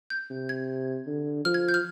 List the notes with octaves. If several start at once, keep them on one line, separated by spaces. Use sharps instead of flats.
G6
C3
G#6
D3
F3 F6
G#6
G6
F6